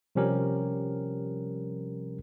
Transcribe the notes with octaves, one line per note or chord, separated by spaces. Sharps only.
C3 F3 G3 C#4 G4 A#4